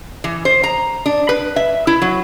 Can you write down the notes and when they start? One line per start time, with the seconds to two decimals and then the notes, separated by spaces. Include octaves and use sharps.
0.24 E3
0.45 C5
0.63 A#5
1.06 D4
1.29 B4
1.56 E5
1.87 E4
2.02 F#3